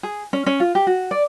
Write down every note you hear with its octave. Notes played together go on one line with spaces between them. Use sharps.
G#4
C#4
C#4
F4
G4
F#4
D5